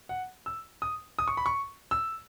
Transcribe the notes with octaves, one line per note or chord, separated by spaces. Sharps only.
F#5
E6
D#6
D#6
C#6
B5
C#6
E6